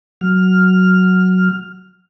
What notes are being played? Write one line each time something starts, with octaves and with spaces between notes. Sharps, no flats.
F#3 F6